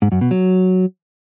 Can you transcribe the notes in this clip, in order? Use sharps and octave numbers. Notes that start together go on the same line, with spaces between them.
G#2
F#2
B2
F#3